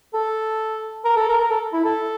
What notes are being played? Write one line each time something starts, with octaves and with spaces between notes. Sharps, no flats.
A4
A#4
A4
A#4
A#4
A4
E4
A4